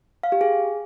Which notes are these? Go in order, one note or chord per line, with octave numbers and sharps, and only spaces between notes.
F5
G4
G#4